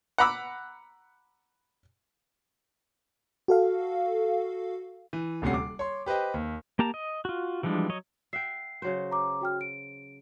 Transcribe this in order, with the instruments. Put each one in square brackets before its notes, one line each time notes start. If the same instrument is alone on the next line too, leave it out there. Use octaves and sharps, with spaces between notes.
[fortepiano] F#5 A#5 B5 D6 E6
[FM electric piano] F#4 A4 F5
[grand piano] E3
D#1 D2 C3 C#4 F#5 C7
D6
C#5 C6
G4 B4 C5 D#5 G5
D#2
[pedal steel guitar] A#3 G4 A5 A#5
D#5
F4 F#4
E3 F3 G3 G#3 D4
F#3 C#5 D#5
[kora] E5 F#5 G5 [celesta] C7
[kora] C#3 F#3 C5
[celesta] A#5 D6
F#4 G5 F6
D7